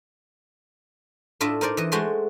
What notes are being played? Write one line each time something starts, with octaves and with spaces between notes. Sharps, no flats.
A2 D4 F4 D#5 E5
D#4 A#4 C5 D5
E3 D#5
G#3 A3 F#4 C5 D#5 C6